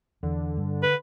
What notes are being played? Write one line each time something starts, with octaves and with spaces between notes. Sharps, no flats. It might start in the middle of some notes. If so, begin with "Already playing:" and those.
E2 D3
G2
B4